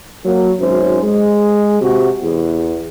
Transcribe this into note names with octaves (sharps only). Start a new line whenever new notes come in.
F#3 A#3
G#1 F#2 C#4 C5
G#3
C3 F#4
E2